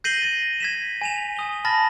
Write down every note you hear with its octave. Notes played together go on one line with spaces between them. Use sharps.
G6 A#6 C7 D#7 F#7 G7
A6 A#6
G#6 B6 E7
G#5 E7 F7
G#5 D#6 G7
A5 B5 F6 A6 A#6